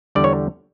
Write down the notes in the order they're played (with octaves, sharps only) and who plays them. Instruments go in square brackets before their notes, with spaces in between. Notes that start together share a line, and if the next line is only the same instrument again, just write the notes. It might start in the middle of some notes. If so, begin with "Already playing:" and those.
[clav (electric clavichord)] E2 D3 G3 D5
C#5